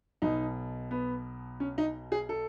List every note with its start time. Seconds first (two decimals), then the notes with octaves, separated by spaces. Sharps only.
0.22 B1 B2 D#4
0.91 B3
1.60 C#4
1.78 D#4
2.12 G#4
2.29 A4